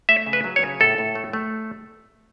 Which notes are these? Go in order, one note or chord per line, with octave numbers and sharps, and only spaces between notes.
A3 E5
C#3
B4
F#3
C#5
C#3
A2 A4
A2
A3
A3